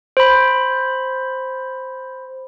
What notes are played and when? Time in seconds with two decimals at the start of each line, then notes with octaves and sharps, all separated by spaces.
0.17 C5 B5